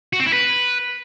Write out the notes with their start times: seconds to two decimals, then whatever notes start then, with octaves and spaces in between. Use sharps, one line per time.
0.13 F#4
0.20 C4
0.26 E4
0.33 B4